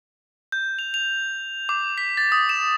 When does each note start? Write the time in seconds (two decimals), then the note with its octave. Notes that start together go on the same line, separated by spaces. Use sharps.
0.52 G6
0.79 F7
0.94 F7
1.69 D6
1.98 B6
2.17 A6
2.32 D#6
2.49 E7